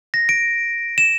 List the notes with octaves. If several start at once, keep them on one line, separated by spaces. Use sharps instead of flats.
A#6
D7
E7